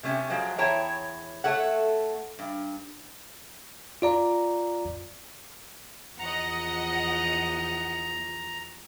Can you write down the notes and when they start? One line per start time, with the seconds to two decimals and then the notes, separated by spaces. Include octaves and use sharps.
0.03 C3 A3 C#4 G4
0.30 F3 F#3 G#3 C5
0.58 E2 E4 C#5 G5 A5 A#5
1.44 A3 A4 C#5 F#5
2.39 G2
4.02 F4 D5 A#5
6.19 E2 F3 D#5 F#5 A#5